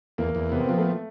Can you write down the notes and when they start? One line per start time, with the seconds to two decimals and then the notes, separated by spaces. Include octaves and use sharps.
0.18 E2 A#3
0.35 E2
0.52 C3 B3
0.60 C4
0.69 F3 B3
0.78 A3